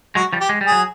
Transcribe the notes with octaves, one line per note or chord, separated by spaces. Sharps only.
F#3 G#3 F#4
F3 G3
G4
G#3
G3
G#4
F#3